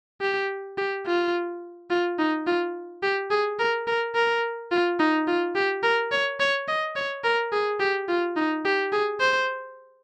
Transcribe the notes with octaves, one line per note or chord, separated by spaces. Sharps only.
G4
G4
F4
F4
D#4
F4
G4
G#4
A#4
A#4
A#4
F4
D#4
F4
G4
A#4
C#5
C#5
D#5
C#5
A#4
G#4
G4
F4
D#4
G4
G#4
C5